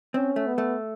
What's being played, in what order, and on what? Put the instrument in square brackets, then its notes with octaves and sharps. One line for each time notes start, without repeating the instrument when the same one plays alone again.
[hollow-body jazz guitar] C4 [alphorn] C#4
[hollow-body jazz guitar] A3
[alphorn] B3
[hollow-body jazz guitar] A3